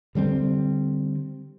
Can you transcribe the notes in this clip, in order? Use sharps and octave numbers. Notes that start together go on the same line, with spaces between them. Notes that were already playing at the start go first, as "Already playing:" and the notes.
D3 G3 A3 C4